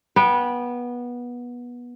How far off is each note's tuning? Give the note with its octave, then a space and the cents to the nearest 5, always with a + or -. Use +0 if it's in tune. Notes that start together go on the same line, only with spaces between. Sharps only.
B3 -20 G5 +0